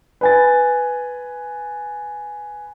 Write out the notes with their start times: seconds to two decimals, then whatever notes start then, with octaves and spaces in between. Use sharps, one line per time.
0.21 B4 G#5 A6